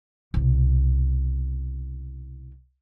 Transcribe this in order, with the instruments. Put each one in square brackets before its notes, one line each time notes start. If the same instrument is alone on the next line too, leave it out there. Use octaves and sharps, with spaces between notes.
[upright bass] C2 B2